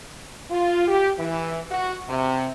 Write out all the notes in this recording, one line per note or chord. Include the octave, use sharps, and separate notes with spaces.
F4
G4
E3
F#4
C3